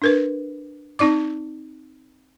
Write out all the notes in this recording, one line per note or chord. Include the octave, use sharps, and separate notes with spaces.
D4 A#4 B4
C4 D#4 D5 D6